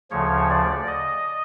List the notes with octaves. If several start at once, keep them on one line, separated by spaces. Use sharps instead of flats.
D2 C#3 F3 C#5
D5
D#5